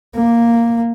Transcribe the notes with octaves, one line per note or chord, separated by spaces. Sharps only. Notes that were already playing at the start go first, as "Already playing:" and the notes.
A#3